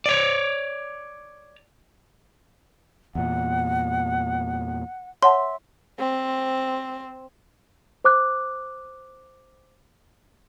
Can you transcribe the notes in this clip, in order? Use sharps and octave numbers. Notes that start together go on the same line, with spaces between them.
C#5 D5
E2 A#2 F#5
C#5 E5 F#5 A5 C6
C4
C5 D6 F#6